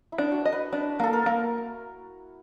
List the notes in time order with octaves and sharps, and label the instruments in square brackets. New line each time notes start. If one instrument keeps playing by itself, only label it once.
[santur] E4
[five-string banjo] D4
[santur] F#4
[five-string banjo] D#5
[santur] B4
[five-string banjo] D4 [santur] B4
[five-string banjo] A#3 [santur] A4
[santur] A#4
[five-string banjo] A#3